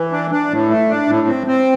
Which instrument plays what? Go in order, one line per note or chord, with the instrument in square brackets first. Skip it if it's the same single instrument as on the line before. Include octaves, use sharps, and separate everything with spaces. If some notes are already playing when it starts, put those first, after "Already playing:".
Already playing: [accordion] E3
D4
D4
A2
A3
D4
A2
C4
C4